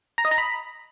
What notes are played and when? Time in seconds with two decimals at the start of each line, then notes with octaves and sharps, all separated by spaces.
0.18 A#5
0.25 D#5
0.31 A#5
0.38 B5